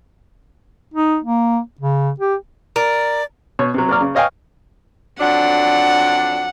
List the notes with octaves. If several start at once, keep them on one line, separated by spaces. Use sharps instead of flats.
D#4
A#3
C#3
G4
A#4 D5
B2 C#5
C3 F#3
F#3 A#3 D5 F6
C#3
C#5 D#5 F5 G5 G#5 C#6
F2 F#3 D4 F#5